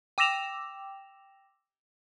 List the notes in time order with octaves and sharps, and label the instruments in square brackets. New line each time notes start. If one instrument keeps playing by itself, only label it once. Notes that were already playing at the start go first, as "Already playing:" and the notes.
[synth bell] G5 D6 E6 A#6 E7 F7